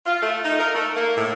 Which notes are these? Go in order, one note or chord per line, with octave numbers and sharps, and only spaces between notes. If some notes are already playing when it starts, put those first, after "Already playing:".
F4
A3
D#4
A#4
A3
A#3
A2